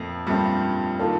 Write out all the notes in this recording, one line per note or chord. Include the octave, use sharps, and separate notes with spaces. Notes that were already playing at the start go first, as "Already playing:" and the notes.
Already playing: F2 A#2 F3 A3 C4
G2 A#2 G3 A3 C4
D#3 A#3 F4 A4